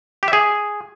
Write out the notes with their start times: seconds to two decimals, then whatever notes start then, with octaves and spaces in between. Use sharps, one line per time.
0.23 G4
0.28 E5
0.33 G#4